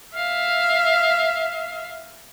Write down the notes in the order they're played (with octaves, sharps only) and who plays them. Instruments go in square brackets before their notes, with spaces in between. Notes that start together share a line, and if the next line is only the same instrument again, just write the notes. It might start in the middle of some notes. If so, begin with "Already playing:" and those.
[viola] E5 F5